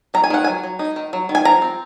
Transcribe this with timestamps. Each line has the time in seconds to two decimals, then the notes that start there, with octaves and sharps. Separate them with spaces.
0.14 F#3 A#5
0.24 G#5
0.30 D#3 F#5
0.44 F#3 G#5
0.63 F#3
0.79 D#4
0.96 D#3
1.13 F#3
1.29 D#3
1.35 G#5
1.45 F3 A#5
1.62 C4